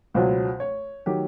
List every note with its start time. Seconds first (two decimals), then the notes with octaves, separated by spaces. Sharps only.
0.14 C#2 B2 F#3 C5
0.60 C#5
1.06 D#3 F#3 G4